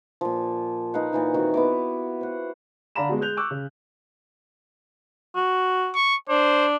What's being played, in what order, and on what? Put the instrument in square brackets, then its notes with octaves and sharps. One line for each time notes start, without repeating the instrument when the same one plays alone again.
[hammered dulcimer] A#2 F3
D#4 B4 F5 F#5
A#2 E3 D#4
D#3 C4 F#4
B3 E4 D6
C5 F#5
[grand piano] D3 D5 F5 A#5 B5 E7
G#3 B3 F#4
G#3 F#6 G6 F7
C#6 D6 E6 F#6
C#3
[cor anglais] F#4
[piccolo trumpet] C#6
[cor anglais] D4 [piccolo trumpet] C5